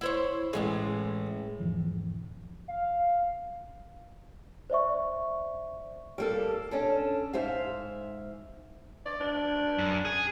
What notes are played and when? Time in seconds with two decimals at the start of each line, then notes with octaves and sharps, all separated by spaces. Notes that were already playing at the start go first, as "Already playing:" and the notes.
0.01 E4 C5 C#5
0.53 A1 A2 G#3 G#4
1.60 E1 G#2 E3 F3
2.68 F5
4.70 C5 D5 E5 C#6
6.18 G3 A#3 A4
6.71 C#4 D4 A4
7.33 G#2 C5 E5 F5
9.06 D5
9.20 D4
9.78 F#2
10.05 G#4